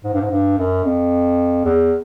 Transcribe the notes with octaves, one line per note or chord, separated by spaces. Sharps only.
G#2
G2
G#2
G2
F#2
F2
E2